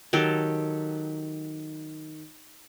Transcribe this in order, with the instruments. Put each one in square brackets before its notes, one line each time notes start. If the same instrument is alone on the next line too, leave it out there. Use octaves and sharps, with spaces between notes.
[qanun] D#3 F#3 G4 A4